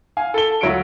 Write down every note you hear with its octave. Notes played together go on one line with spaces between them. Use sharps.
F5 G#5
A4 A5 G7
D2 F#3 F4 E5 C#7 D7